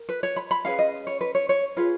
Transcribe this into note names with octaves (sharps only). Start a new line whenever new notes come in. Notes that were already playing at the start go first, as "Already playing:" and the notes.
Already playing: A#4
B4
C#5
B5
B5
C#4 G#4 B4 F5
D#5
C#5
B4
C#5
C#5
F4 G#4 B4